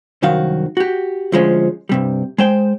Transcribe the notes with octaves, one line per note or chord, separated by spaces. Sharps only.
C2 F#2 D#3 F#4 F5
F#4 G4
D2 F3 G#3 C#4
G2 C3 G3
G#3 C5 G5